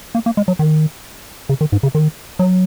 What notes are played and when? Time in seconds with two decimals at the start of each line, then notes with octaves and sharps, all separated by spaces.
0.15 A#3
0.26 A#3
0.37 G#3
0.48 F#3
0.59 D#3
1.49 C#3
1.61 D#3
1.72 G#2
1.83 C#3
1.95 D#3
2.39 F#3